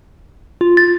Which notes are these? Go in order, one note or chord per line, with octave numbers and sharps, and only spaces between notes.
F4
A6